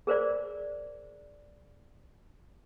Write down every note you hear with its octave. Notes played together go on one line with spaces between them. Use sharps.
G#4 A#4 C5 D5